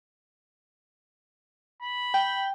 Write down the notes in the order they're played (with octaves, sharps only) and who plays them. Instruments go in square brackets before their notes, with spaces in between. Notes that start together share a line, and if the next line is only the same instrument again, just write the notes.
[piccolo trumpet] B5
[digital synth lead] G5